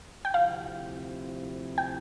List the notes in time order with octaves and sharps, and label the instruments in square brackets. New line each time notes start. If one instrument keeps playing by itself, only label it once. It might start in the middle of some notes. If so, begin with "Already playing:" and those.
[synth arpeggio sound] G5
[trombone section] D2 C3 F3 C4 E4 [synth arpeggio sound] F5
[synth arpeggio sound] G5